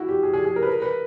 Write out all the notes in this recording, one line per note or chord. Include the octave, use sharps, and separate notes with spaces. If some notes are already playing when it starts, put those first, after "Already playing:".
Already playing: E4 F#4
G4
G#4
G#4
G#4
A#4
B4
A#4
B4